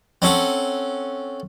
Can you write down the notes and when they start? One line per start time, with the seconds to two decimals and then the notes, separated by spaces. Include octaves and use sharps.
0.22 C4 C#4 A4 F#5